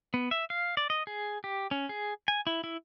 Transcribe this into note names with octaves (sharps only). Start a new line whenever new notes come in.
B3
E5
F5
D5
D#5
G#4
G4
C#4
G#4
G#5
E4
E4